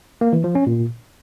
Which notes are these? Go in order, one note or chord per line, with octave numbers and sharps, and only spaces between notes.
A#3
E3
F3
C#4
A#2